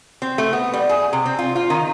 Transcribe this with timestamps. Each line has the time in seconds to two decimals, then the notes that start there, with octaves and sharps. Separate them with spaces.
0.22 C4
0.38 A3
0.53 B3
0.74 G3
0.89 G#4
1.13 C3
1.26 C4
1.39 F4
1.55 F4
1.70 D#3